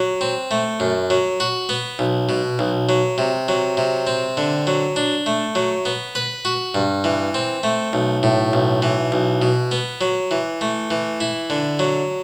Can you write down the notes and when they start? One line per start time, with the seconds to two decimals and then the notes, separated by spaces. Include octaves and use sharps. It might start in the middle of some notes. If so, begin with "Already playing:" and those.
Already playing: F#3
0.21 C4
0.51 A3
0.80 F#2
1.10 F#3
1.40 F#4
1.69 B3
1.99 B1
2.29 B2
2.59 B1
2.89 F#3
3.18 C3
3.48 F#3
3.77 C3
4.07 C4
4.37 D3
4.67 F#3
4.96 D4
5.26 A3
5.55 F#3
5.85 B3
6.15 B4
6.45 F#4
6.75 G2
7.04 E3
7.34 C4
7.63 A3
7.93 B1
8.23 A2
8.53 B1
8.82 E3
9.12 B1
9.42 B2
9.71 B3
10.01 F#3
10.31 E3
10.61 A3
10.91 E3
11.20 E4
11.50 D3
11.79 F#3